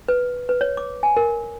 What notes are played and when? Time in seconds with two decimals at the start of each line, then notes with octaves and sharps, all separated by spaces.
0.08 B4
0.49 B4
0.61 C#5
0.77 D6
1.03 G#5
1.17 A#4